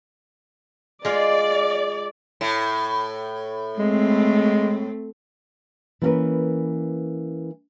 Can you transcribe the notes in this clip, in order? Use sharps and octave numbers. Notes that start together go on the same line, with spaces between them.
G#3 F4 D5 F5
A2
G#3 A3 C4
E3 A#3 B3 C#4 A#4 B4